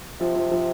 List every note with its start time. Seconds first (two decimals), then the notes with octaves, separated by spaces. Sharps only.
0.20 C3 F3
0.36 F3
0.51 F3